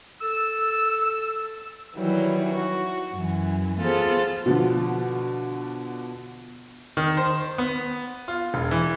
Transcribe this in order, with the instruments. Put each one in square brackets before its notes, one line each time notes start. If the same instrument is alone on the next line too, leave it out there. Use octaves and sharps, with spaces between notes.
[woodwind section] A4 E6
[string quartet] D#3 E3 F#3 G3
F#4
F#2 E3
B3 F4 G#4 A4 C5
[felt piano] B2 D3 F3
[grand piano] D#3
C5
B3
F4
E1
E3